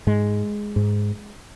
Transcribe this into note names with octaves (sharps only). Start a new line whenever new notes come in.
G#2 G#3
G#2